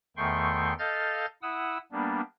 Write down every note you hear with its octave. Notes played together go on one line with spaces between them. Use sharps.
E2 D#3 A3 G5 C6 C#6
A4 D#5 F5 F6 G6 A6
E4 F#5 D#6 E6
G3 A#3 B3 D4